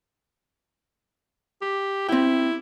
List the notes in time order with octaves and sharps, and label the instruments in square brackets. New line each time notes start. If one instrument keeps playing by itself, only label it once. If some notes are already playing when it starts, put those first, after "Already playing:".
[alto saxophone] G4
[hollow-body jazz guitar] C4 G5 [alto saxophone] E4